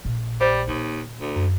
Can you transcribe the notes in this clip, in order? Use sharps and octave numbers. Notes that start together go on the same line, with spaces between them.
A#1
G3 C5
D#2 A#2
D2
F#2